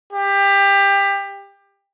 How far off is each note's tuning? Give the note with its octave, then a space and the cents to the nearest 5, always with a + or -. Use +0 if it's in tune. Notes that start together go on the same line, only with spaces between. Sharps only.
G4 +25